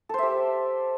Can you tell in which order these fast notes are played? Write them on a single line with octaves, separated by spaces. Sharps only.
A4 C5 E5 G4